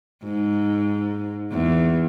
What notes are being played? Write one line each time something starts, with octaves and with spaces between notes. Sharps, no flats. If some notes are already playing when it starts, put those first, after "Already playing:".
G#2
E2